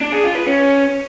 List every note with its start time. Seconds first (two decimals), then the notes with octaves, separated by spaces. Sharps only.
0.01 D4
0.12 G#4
0.24 F4
0.35 B4
0.47 C#4